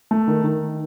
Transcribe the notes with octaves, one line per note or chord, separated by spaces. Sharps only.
A3
D#3
D#3